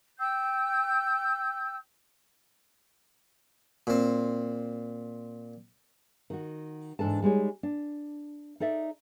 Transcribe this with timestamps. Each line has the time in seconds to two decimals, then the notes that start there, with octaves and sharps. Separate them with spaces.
0.19 G5 E6 G6
3.87 A#2 C4
6.30 D#3 F#4
6.99 G#2 E3 D4 A4 A5
7.22 G3 G#3 D#4 C#5
7.63 D4
8.60 D#4 A4 D5 E5